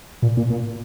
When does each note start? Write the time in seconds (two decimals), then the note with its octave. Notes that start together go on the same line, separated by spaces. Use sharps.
0.22 A#2
0.37 A#2
0.50 A#2